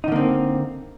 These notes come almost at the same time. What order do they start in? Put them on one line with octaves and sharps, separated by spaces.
D#4 D3 A#3 C4